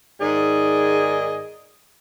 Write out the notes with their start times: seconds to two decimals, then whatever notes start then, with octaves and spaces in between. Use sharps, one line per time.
0.20 G#2 D#3 G#4 D5 D#5